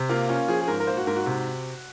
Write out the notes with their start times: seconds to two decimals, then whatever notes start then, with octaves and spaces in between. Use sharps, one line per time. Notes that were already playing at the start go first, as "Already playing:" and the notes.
Already playing: C3
0.09 A#3 F4
0.29 C#4 F4
0.48 F3 G#4
0.61 G#4
0.68 G#2 A#4
0.80 A#4
0.87 A#3 C5
0.97 F#4
1.07 G#2 A#4
1.16 F#4
1.26 C3